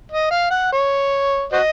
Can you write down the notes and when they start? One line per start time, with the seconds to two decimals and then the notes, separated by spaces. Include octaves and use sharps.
0.12 D#5
0.31 F5
0.51 F#5
0.72 C#5
1.53 F#4 C5 D#5